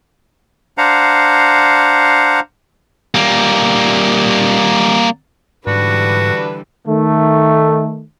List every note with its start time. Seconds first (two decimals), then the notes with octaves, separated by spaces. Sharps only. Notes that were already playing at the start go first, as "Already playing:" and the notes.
0.78 D4 C5 F5 F#5 A#5
3.15 G3 A#3
5.67 G#2 D3 E3 G3 D4 F#4 B4
6.87 D#3 A3